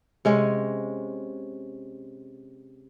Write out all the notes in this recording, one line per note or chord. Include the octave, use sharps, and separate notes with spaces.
C3 G#3 C#4